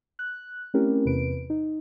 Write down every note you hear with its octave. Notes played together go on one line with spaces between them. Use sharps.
F#6
A3 C4 C#4 E4 G4 A#4
E2 C3 B4 D7
D#4